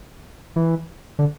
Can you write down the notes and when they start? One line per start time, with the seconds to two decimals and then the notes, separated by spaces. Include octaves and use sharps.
0.56 E3
1.19 D3